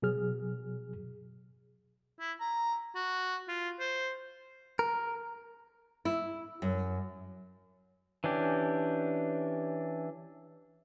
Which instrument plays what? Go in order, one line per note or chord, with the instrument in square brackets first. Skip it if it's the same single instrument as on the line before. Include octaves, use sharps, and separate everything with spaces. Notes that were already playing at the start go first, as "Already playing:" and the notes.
[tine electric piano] B2 F#3 G#4 F6
[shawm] E4
A#5
F#4
F4
C5
[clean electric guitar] A#4
[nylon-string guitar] E4
F#2
[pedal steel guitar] E3 C#4 D4 G4